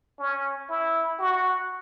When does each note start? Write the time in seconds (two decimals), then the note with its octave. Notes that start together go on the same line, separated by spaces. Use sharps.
0.19 C#4
0.69 E4
1.19 F#4